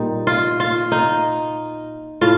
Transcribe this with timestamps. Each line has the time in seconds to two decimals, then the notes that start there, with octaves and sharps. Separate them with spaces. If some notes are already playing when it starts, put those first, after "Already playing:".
Already playing: A#2 G3 D#4
0.27 F4
0.60 F4
0.92 D#4
2.21 A2 F4